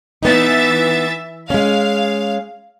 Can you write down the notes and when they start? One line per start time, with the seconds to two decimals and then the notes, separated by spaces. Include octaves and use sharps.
0.23 E3 B3 D#4 E5 A6
1.50 G#3 C#4 F5